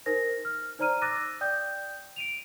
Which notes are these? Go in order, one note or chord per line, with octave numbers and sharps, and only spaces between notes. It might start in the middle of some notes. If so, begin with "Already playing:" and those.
D#4 A#4 C5 A#6
F6
D#4 C5 D5 A#5 F6 D#7
D6 E6 F#6 A6 A#6 D#7
D5 G5 D#6 G6
D7 D#7 F7